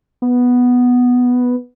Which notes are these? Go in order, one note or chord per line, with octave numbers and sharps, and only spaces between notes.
B3